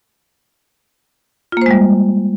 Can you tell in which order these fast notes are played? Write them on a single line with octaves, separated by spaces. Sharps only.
F4 A#3 C5 G#3 G3